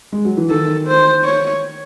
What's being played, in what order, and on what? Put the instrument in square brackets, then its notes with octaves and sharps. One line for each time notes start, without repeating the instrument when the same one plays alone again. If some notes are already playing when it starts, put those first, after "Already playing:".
[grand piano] G#3
F#3
E3
[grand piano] D#3 [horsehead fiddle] A4
[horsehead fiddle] C5
C#5